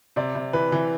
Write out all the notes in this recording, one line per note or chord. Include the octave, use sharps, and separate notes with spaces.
C3 D5
C3
E3 B4
E3